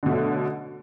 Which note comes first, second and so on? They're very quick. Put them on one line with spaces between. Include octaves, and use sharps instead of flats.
D3 B2 A3 F#3